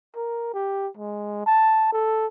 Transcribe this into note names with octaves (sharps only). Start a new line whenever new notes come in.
A#4
G4
G#3
A5
A4